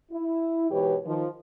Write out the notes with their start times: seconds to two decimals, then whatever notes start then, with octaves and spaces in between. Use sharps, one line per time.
0.11 E4
0.71 G#2 B2 E3 G4 B4 C#5
1.06 D#3 F3